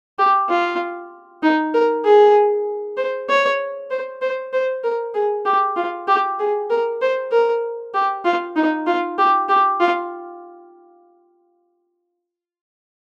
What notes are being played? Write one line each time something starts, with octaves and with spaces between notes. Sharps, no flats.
G4
F4
D#4
A#4
G#4
C5
C#5
C5
C5
C5
A#4
G#4
G4
F4
G4
G#4
A#4
C5
A#4
G4
F4
D#4
F4
G4
G4
F4